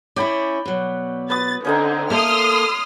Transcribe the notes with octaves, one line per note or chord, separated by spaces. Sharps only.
C#4 E4 D5 G5 B5
B2 F#3
B4 D#6 A6
D3 C4 C#4 D#4 A#5
A#3 A4 E5 C6 D#6 F6